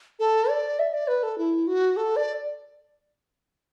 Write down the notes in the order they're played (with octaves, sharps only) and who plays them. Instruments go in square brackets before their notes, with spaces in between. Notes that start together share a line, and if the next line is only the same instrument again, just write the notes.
[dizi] A4
D5
E5
D5
B4
A4
E4
F#4
A4
D5